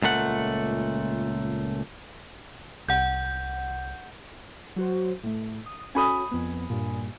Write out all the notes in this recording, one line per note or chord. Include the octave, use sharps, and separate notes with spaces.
C#2 A#2 A3 F#5
C2 F#5 G6
F#3 F#4 C5
A2 A3
D#6
C#4 F#4 A4 G#5 B5 D#6
F2 B3
G2 A#2